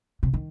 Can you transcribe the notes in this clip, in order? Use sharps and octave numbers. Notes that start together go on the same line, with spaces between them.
C3
D#3